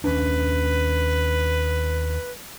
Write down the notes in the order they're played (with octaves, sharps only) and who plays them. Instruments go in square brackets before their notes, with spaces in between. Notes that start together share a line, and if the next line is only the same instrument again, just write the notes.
[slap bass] D#2 C#4 D4 [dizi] B4